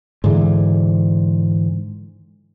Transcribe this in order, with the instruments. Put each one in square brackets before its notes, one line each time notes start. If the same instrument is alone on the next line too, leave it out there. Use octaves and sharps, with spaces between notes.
[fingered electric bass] G#2 D3 E3